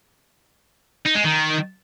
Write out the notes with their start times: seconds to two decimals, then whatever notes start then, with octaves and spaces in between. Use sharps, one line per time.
1.06 D#4
1.16 G#3
1.25 D#3